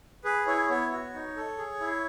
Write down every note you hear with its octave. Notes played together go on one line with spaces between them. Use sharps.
G#4 B4
E4 C#5
B3 C#5
F#4
D#4
A4
G#4
E4